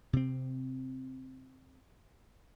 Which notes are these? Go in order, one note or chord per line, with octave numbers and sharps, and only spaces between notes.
C3 C4